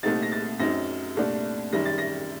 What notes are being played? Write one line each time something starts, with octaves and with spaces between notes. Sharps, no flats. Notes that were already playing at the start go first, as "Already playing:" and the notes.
C2 A#2 A3 C4 D#4 A6
A#6
A6
F#2 F#3 C4 D#4 A#6
C2 A#2 A3 D4
F#2 D#3 G3 A#6
A6
A#6